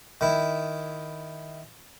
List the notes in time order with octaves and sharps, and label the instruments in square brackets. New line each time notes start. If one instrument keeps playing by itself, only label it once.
[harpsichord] D#3 E4